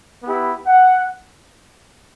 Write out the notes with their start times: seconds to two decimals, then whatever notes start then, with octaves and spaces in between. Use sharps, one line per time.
0.22 B3 E4 G4
0.65 F#5